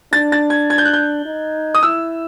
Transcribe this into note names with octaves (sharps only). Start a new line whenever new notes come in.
D4 A6
A6
G#6
G#6
G6
F#6
G6
D#4
D#6
E4 E6